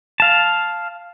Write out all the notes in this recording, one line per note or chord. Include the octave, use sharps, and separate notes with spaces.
F5 A5